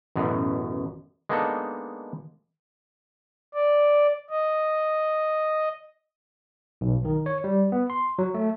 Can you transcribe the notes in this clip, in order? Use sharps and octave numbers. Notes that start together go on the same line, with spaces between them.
A1 F#2 B2
G#3 A#3 B3 D4 D#4 A4
D5
D#5
B1
D#3
C#5
G3
B3
C6
F#3
A3